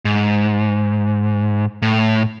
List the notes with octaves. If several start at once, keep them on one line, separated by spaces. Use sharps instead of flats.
G#2
A2